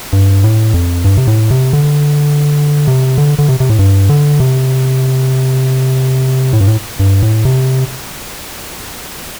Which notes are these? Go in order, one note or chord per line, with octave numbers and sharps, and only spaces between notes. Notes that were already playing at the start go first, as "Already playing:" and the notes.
G2
A2
F2
G2
C3
A2
C3
D3
C3
D3
D3
C3
C3
A2
G2
D3
C3
A2
G2
A2
G2
A2
C3